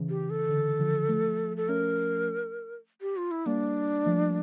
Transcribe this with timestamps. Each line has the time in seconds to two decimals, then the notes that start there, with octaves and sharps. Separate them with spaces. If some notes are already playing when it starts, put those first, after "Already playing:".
Already playing: C#3 E3
0.10 G4
0.30 A4
0.49 D3
0.79 D3 F3
1.09 F3 A3
1.57 A4
1.69 A3 C#4 A#4
3.01 G4
3.17 F4
3.31 E4
3.46 G3 A#3 D4
4.05 F3 A3